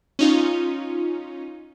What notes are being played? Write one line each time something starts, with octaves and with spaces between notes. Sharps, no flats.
C#4 D#4 F4